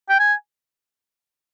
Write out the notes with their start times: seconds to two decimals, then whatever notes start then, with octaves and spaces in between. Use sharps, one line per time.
0.09 G5
0.20 G#5